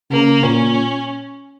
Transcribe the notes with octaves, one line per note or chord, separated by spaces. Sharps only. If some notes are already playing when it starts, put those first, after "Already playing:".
C#3 A#3
A#2 C#4